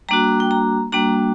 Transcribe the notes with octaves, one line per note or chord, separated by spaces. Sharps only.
G3 A#3 D4 F#4 A#5
G5
A#5
G3 A#3 D4 F#4 A#5